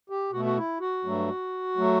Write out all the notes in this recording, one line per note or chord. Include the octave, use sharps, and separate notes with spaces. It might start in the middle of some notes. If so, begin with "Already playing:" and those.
G4
B2 A3 F#4
F#4
E4
F#4
G2 F#3 A3
F#3 A3